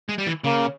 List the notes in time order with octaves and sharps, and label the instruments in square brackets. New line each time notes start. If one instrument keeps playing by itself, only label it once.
[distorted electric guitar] G#3
G3
E3
[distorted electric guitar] C#3 [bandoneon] A#3